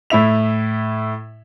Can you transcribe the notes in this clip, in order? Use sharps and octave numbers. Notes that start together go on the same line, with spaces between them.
A2 E4 E5 F7